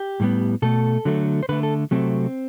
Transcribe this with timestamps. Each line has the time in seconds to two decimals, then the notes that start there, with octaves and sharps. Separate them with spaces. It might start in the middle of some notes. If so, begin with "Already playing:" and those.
Already playing: G4
0.20 A2 G3 B3
0.62 B2 A3 A4
1.05 D3 F#3 A3
1.43 C5
1.49 D3 A3 B4
1.63 A4
1.91 C3 F#3 A3 C4